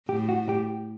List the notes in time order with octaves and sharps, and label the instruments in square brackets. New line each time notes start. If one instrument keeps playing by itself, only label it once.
[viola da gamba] A2 [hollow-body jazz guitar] G4
[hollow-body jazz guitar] F#4
G4